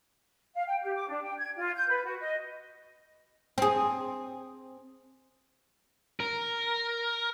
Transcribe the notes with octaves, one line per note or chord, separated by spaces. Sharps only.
F5
G5
G4
D6
D4
G5
G#6
F4
G6
B4
F#4
D#5
C4 G#4
A#4